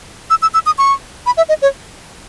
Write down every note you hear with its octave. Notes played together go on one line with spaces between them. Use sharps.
E6
E6
E6
D#6
C#6
B5
E5
D#5
C#5